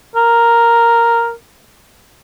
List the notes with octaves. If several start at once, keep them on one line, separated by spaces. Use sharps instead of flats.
A#4